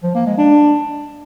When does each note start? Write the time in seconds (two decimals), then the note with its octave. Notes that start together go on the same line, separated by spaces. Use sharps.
0.03 F3
0.15 A#3
0.26 G#3
0.38 D4